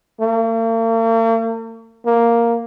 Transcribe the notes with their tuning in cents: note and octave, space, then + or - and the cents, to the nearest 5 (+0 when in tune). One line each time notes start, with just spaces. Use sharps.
A#3 -45
A#3 +0